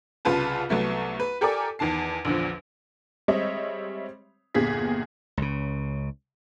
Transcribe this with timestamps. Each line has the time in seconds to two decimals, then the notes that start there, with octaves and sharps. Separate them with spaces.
0.25 C2 C#3 F4 B4 A5
0.69 C2 F#3 A3 B3
1.20 B4
1.41 G4 A4 A#4 D5 G#5 D6
1.79 E2 D#3 A5 C7
2.25 A#1 E2 D3 F3
3.28 G3 G#3 C4 C#5 D#5 E5
4.55 G1 E2 A#2 G4 G#4 B6
5.37 C#2 C#3